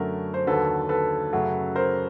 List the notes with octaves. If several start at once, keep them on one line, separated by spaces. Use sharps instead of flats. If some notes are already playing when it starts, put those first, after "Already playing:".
Already playing: F#2 D3 F#3 A3 A#4
C5
D#2 D3 F#3 A4 B4
A4 B4
F#2 C#3 F#3 A3
A#4 C5